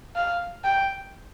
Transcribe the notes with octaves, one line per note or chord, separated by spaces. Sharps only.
F5
G5